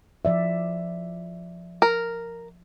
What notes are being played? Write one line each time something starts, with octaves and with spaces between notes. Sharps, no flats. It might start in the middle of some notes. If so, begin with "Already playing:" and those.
F3 D5 E5
A#4